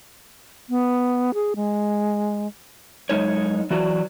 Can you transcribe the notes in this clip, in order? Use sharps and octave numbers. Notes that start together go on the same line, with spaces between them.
B3
G#4
G#3
F#2 G#3 D#4 C#5
E3 F#3 F#4 D5